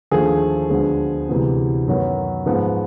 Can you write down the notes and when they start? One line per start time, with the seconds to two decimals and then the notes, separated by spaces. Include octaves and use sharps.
0.11 D#2 D3 F3 A3 G#4
0.70 D2 D3 F3 G#3 B3
1.28 D2 C3 E3 G#3 B3
1.88 F#2 D#3 F#3 B3
2.46 G#2 F3 G#3 B3